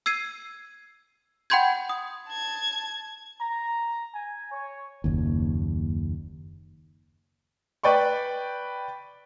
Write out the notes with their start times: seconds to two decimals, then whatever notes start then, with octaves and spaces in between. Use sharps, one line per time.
0.06 E6 G#6 C7 D#7
1.50 F#5 G5 B5 C6 G6 G#6
1.89 D#6
2.29 A5 G#6
3.40 A#5
4.14 G#5
4.51 C#5
5.04 F#1 D#2
7.83 B4 D5 G5 B5 C#6